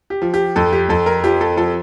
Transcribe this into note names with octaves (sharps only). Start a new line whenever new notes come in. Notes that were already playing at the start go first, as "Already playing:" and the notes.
G4
F3
G4
F2 A4
G4
F2 A4
A#4
F3 G4
A4
F3 A4